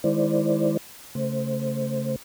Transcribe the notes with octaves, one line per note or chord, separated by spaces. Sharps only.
D#3 G#3 E4 C5 D5
C#3 A3 C5